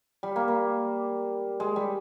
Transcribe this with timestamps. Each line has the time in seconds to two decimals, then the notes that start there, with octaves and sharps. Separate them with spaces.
0.23 G3
0.36 A#3
0.48 A#3
1.60 G#3
1.76 G3